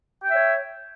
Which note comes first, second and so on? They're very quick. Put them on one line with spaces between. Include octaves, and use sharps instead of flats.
G5 E5 C#5